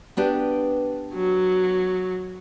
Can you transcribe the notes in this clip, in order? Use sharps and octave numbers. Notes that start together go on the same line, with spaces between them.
B3 D4 G4
F#3